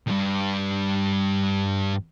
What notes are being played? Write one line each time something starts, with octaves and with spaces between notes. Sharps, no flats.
E2 G2